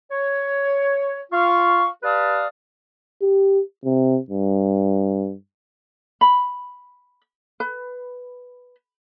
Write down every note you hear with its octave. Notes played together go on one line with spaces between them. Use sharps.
C#5
F4 F5 C#6
G4 B4 D5 F5 A5 D#6
G4
C3
G2
B5
B4